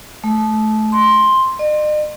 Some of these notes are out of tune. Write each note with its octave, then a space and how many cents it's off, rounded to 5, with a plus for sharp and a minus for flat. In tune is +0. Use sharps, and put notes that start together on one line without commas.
A3 -25
C6 +5
D#5 -45